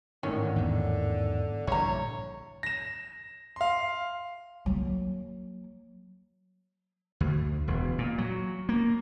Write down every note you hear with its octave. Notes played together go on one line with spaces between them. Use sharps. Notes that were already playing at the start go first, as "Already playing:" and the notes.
G#1 A2 D3 D#3 C#4
E2 G#2
A#1 G2 D3 E3 C#5 A#5
A#6 E7
F5 C6
F#3 A#3
D2
E1
A#2
F#3
A#3